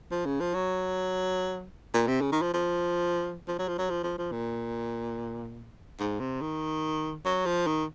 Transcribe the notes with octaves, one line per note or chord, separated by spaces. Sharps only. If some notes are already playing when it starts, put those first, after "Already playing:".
F3
C#3
F3
F#3
A#2
C3
C#3
D#3
F3
F3
F3
F#3
F3
F#3
F3
F3
F3
A#2
G#2
C3
D#3
F#3
F3
D#3